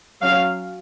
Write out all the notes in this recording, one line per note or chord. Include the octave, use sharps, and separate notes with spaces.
F#3 C#4 F5